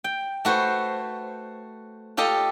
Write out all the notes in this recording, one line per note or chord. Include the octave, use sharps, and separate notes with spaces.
G5
A3 F#4 B4 C5
F4 G4 A4 D#5 F5